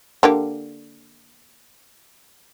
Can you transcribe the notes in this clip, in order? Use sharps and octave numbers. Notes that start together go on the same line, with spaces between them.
D3 A#3 G4